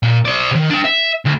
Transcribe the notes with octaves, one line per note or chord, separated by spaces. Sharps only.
A#2
C5 D5
C3 D#3
D4 G5
E5
D2